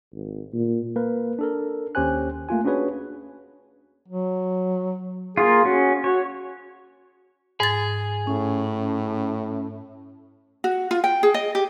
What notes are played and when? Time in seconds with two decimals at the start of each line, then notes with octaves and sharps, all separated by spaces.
0.13 G#1
0.53 A#2
0.96 A#3 A#4 B4
1.39 D4 A4 A#4
1.95 D#2 C#4 G4 C5 G#5 F#6
2.49 A3 A#3 F4 G#5
2.65 C#4 D4 F#4 G#4 B4 C#5
4.08 F#3
5.37 A#3 F4 G#4
5.65 C#4 F#4
6.04 F#4 C#5
7.60 G#2 G#4 A6
8.27 A2 C#4
10.64 F#4
10.91 F4
11.04 G5
11.23 G#4
11.34 D#5
11.55 G4